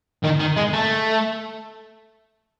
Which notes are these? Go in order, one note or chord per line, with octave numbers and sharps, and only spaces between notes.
D#3
D#3
G#3
A3